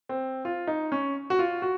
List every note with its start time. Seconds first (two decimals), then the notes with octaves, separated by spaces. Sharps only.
0.09 C4
0.45 F4
0.67 D#4
0.92 C#4
1.30 F#4
1.39 F4
1.62 F#4